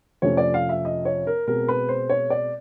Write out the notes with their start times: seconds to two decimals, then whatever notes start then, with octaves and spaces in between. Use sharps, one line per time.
0.22 F2 C3 F3 A3 C#4 C#5
0.37 D5
0.54 F5
0.69 E5
0.85 D#5
1.05 C#5
1.27 A#4
1.47 B2 G#3 C4 A#4
1.68 B4
1.89 C5
2.09 C#5
2.30 D5